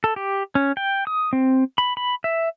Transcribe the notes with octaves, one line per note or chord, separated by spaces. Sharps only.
A4
G4
C#4
G5
D#6
C4
B5
B5
E5